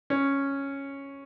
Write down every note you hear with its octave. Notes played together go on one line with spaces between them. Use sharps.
C#4